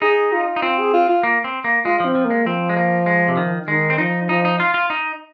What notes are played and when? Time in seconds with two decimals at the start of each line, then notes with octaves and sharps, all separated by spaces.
0.02 D#4 G#4
0.32 F4
0.56 D#4
0.62 C4 F4
0.79 G#4
0.93 F4
1.09 F4
1.23 A#3
1.44 C4
1.64 A#3
1.85 G#3 F4
2.00 F3 C4
2.15 F3
2.25 A#3
2.30 G#3
2.46 F3 C4
2.69 G#3
2.77 A#3
3.06 G#3
3.28 C3
3.37 D#3
3.68 D#3 G#3
3.90 C4
3.98 F3 D#4
4.29 F3 D#4
4.45 D#4
4.60 F4
4.74 F4
4.90 D#4